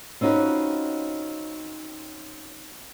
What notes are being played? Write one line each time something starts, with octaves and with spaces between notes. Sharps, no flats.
C4 C#4 D#4 F4 F#4 B4